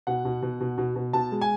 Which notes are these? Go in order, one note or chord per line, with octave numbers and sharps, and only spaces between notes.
B2 F#5
B2
B2
B2
B2
B2
B2 A5
G#3
G#5